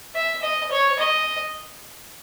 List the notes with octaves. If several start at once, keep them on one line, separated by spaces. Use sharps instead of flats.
E5
D#5
C#5
D#5